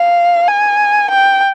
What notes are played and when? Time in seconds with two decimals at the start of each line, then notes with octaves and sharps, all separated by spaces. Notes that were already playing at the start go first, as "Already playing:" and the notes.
Already playing: F5
0.48 G#5
1.11 G5